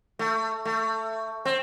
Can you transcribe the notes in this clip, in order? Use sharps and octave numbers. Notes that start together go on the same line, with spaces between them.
A3
A3
C4